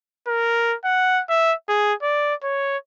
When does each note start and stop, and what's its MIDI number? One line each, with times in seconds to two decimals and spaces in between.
0.27 0.75 70
0.85 1.22 78
1.30 1.54 76
1.68 1.93 68
2.03 2.34 74
2.43 2.78 73